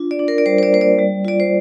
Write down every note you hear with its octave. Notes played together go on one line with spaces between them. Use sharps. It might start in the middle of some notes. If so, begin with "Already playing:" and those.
Already playing: D4 F4
D5
D4
A#4
D5
G3 C5
C5
D5
A#3 C5
D5
G3
F4 D5
C5